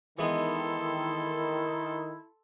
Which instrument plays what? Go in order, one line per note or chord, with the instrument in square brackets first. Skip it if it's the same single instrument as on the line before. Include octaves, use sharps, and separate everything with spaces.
[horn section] D#3 [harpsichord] E3 G#3 B3 [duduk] E4 [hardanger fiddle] A4 C6